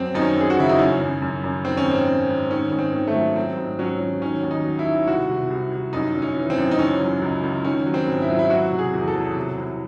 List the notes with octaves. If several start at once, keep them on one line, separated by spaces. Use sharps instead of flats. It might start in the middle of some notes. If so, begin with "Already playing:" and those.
Already playing: F#2 F#3 C4
F#2 D#4
C#4
F#2 G#4
F#4
C#3 E4
D#4
F#2 C#4
F#2
F#2
F#2
D#3 C4
C#4
G#2
C4
G#2
G#2
D#3 C#4
G#2
C4
D#3
A3
F#3
F#3 C4
G#2
F#3 C#4
F#3
D#3 C#4
D#2
D#4
F#3
E4
D#3
C2 F#4
C3
C2
C2
F#2 D#4
F#2
C#4
E3
C4
F#2
D#4
C#2 C#4
F#3
C#2
C#2
D#3 C#4
F#3
C4
G#2
E4
F#3
E4
F#3 F#4
C3
G#4
E2
A4
F#3
C3
C2